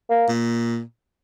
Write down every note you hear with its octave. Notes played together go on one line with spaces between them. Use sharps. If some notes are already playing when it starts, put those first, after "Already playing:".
A#3
A#2